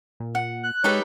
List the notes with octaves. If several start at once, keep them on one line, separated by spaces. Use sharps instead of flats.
A#2
F#5
F#6
G#3 D#4 G4 A4 B4 C#5